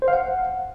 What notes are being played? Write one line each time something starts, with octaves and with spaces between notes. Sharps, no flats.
C5
F5
F#5